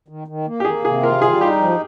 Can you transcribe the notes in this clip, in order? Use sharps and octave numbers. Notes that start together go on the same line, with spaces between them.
D#3
D#3
A#3
G4
A#3 G#4
C3 G#4
F4 A#4
G3 G#4
D#4 G4
F3